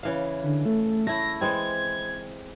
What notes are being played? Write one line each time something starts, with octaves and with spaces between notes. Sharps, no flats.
C#3 E3 F5
D3
A3
A3 E4 A#6
E3 G#3 C4 G#6